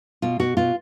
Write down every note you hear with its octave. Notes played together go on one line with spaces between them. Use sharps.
B2 F4
B2 F#4
B2 F4